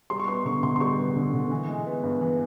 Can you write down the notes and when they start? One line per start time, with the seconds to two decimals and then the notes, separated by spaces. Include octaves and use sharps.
0.10 G3 C6
0.20 C#6
0.28 B3 C6
0.45 D3 C#6
0.63 D3 C6
0.76 C6
0.80 G3 C#6
0.98 B3
1.16 D3
1.34 D3
1.51 E3
1.68 G#3
1.86 B3
2.03 G2
2.21 E3